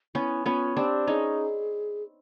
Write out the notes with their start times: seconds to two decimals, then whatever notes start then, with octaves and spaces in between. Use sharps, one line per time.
0.15 B3 C#4 E4
0.45 B3 C#4 F4
0.76 C4 D4 G4
1.07 C#4 D#4 G#4